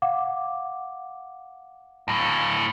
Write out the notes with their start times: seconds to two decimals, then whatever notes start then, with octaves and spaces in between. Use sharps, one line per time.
0.02 F5 F#5 D6
2.08 D2 A2